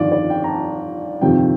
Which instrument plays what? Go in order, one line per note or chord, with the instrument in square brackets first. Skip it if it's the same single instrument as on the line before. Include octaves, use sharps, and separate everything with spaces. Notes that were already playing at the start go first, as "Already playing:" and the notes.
Already playing: [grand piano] G1 F2 D#3 D5
D5
G5
A#5
A5
G1 F2 C3 D#3 G5